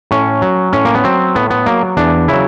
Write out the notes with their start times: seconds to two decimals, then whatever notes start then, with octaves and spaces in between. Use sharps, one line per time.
0.11 A2 C#4
0.42 F#3
0.73 A2 C#4
0.85 A#3
0.95 B3
1.04 F#3 C4
1.35 A2 B3
1.50 B3
1.66 F#3 A#3
1.97 E2 D4
2.28 C#3 F#3 E4